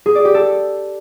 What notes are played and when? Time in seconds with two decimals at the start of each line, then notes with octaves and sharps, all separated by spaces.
0.06 G#4
0.15 D5
0.25 G4
0.34 A4